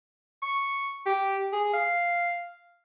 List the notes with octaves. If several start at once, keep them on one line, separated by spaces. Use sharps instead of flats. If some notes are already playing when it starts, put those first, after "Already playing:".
C#6
G4
G#4
F5